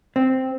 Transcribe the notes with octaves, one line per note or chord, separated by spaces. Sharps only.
C4